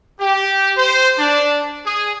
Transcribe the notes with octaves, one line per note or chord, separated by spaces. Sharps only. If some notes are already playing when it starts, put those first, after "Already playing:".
G4
C5
D4
G#4